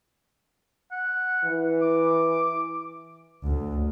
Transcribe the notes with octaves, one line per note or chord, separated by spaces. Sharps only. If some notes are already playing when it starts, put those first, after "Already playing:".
F#5
E3
D6
D2